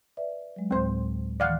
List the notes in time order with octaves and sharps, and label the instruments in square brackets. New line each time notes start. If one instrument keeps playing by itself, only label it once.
[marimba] B4 D5 E5
F#3 G#3
[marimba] D2 A2 [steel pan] C4 C5
[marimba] D#3 E3 [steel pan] D5 F5 F#5